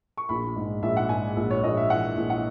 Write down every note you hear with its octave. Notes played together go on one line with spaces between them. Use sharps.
C#6
A#1 B5
G#2
A#1 E5
F#5
G#2 G#5
A#1
C#5
A#1 D#5
E5
E3 F#5
A#1
F#5